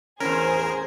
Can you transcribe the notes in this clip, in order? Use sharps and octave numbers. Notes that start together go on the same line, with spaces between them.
E2 A2 C#4 G#4 A#4 C5